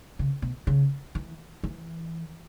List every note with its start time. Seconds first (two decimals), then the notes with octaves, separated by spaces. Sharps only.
0.19 C#3
0.42 B2
0.67 C#3
1.15 E3
1.63 E3